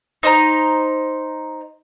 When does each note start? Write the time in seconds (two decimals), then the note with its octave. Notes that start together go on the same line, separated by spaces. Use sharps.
0.23 D#4 C5 A#5